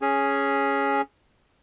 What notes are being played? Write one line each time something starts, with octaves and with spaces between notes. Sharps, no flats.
C#4 G#4